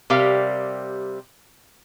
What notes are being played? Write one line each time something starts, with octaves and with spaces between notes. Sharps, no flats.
C3 G3 G4 A#4 F5